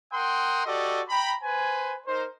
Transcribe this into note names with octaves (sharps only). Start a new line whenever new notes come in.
A#4 F#5 G5 C6 D#6
F#4 G4 A4 D5 D#5
G5 A#5 B5
B4 C5 G#5
D#4 A#4 C5